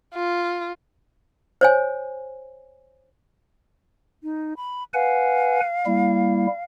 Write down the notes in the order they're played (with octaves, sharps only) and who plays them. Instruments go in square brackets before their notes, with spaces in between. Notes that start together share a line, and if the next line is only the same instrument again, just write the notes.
[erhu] F4
[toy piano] C5 C#5 G#5
[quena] D#4
B5
[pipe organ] B4 F#5 G#5 [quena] F5
[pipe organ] G3 A#3 E4